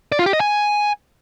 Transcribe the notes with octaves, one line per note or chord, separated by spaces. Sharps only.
D5
F4
G4
D#5
G#5